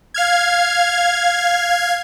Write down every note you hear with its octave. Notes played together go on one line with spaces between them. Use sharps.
F5 F6 G#6